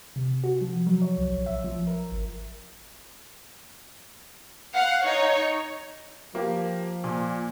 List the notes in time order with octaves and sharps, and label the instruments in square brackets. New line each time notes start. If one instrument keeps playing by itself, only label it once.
[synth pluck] C3
F#4
F3
F#3
C#5
C2
A#1
E5
F3
A#4
G#1
[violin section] F5 F#5
D#4 C#5
[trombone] F3 [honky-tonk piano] A#3 G4
[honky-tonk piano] A#2